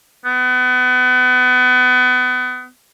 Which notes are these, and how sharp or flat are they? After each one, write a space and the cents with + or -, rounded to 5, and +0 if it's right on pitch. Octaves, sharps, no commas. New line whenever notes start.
B3 +30